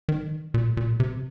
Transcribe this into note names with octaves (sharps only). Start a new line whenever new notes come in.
D#3
A#2
A#2
C3